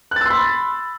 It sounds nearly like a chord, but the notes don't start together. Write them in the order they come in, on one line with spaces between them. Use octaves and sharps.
F#6 A6 E6 C6 B5